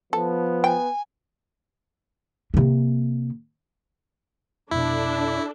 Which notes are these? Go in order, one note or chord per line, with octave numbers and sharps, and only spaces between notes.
F3 B3 A4
G5 G#5
C3 A#3
F1 B2 D4 E4 A4